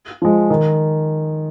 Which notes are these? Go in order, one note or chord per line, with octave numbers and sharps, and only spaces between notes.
F3 G#3
D#3